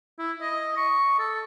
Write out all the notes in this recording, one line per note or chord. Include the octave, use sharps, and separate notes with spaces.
E4
D#5
C#6
A4